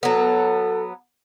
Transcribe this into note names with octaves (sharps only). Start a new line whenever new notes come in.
F#3 B3 A4